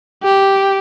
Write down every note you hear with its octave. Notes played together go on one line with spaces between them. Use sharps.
G4